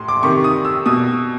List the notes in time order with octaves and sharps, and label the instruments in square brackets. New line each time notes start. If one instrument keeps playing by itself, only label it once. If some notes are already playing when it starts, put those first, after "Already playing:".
Already playing: [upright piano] A2 C6
D6
C3 D#3 C#6
D#6
E6
B2 D#6